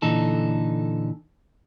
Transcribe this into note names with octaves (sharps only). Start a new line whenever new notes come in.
A#2 D3 E3 D#4 A4